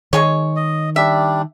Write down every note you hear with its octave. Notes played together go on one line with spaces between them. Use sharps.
D#3 G#3 G#4 C#5
D#5
G3 D4 E5